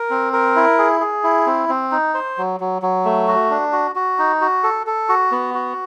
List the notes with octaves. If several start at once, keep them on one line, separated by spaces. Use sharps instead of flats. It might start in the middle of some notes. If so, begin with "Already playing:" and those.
Already playing: A#4
C4
A#4
E4
G#4
G#4
E4
C4
C4
D#4
C5
F#3
F#3
F#3
A3
F#4
D4
F#4
F#4
D#4
F#4
A4
A4
F#4
B3
F#4